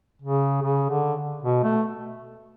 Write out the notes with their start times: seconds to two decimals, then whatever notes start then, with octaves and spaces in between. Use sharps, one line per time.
0.22 C#3
0.62 C#3
0.89 D3
1.43 B2
1.63 A3